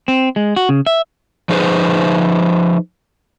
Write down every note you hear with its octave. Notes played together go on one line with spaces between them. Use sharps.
C4
G#3
F#4
C#3
E5
F3 D#4 G#4 B4 C5